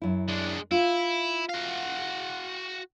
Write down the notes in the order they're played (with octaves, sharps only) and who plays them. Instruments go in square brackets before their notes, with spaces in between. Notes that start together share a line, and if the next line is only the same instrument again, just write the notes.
[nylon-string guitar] F#2 E4
[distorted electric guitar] G#3 D4
[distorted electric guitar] E4 [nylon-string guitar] F4
[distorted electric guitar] F#4 F5